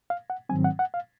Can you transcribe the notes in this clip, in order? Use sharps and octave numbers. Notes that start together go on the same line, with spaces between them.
F5
F#5
G#2 D#3 F#3 C4 G#5
F#5
F#5
F5